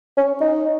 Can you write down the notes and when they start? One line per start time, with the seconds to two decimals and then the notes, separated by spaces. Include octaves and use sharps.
0.17 C#4
0.41 D#4